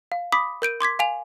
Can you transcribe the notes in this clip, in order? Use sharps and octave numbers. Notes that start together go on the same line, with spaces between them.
F5
B5 D6 D#6 B6
A#4 G6 D7 D#7
C6 D6 G#6 B6
F5 G#5 F7